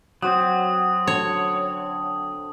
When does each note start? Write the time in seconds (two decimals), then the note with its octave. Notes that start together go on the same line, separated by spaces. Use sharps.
0.22 F#3 C4 F#4 C5 D6 D#6
1.07 D3 C#5